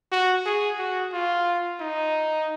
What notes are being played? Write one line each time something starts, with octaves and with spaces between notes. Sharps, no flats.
F#4
G#4
F#4
F4
D#4